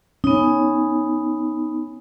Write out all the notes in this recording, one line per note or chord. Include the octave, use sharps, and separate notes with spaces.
B3 C#4 D#4